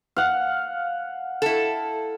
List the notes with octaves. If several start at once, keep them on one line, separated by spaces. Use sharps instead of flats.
F5 F#5
E4 A4